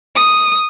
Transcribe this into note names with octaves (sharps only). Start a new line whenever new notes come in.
D#6